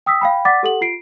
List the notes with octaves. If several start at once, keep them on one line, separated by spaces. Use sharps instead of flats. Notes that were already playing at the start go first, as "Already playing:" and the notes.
G5 D#6 E6 B6
F5 G5 B5
D5 F#5 D6 A6 B6
G4 A4 F#5 F#7
F4 C7 D7